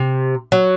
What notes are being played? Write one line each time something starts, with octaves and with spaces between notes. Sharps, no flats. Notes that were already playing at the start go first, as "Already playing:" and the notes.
Already playing: C3
F#3